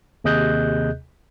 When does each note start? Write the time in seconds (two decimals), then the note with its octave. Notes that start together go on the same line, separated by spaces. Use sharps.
0.24 D#2 C3 G#4 D#5 F#6 G6